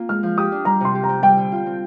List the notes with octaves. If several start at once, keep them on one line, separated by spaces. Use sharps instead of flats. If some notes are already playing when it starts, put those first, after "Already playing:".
Already playing: A#3 C4 F4
G#3 F6
F3
G4 D#6
D4
G3 A#5
C3 C6
G4
A#5
C4
G3 G5
D3
F4
C4